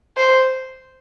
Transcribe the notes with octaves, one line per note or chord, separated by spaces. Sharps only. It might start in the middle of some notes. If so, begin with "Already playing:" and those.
C5